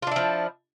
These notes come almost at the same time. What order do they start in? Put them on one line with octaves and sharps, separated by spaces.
F4 D4 E4 F3